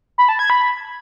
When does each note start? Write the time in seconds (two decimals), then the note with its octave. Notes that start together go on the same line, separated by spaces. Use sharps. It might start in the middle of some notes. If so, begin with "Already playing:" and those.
0.18 B5
0.29 A5
0.39 G#6
0.50 B5